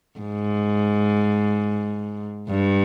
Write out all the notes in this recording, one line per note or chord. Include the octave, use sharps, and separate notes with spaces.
G#2
G2